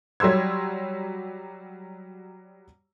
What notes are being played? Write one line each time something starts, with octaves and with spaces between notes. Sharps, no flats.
F#3 G3 C6 E6 G#6